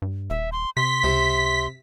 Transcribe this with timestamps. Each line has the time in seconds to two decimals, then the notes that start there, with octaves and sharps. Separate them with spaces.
0.02 G2
0.30 D#1 E5
0.52 C6
0.77 C3 C6 B6
1.04 C#2 C3